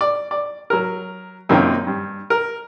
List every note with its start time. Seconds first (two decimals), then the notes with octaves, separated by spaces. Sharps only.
0.01 D5
0.31 D5
0.70 F#3 A#4
1.49 F#2 A#2 D#3 A#3 C4 C#4
1.87 G2
2.30 A#4